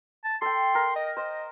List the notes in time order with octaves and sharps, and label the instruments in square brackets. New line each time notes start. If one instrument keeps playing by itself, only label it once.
[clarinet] A5
[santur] A4 G5 [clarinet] C6
[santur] A#4
[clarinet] D#5
[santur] C5 [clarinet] D#5